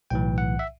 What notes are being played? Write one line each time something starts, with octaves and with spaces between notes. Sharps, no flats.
B1 A2 E3 G5
F#5
E5